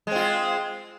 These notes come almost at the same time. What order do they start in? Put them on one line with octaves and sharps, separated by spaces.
G#3 C4 F4